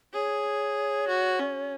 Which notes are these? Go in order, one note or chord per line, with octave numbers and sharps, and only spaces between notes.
G#4 C#5
F#4
C#4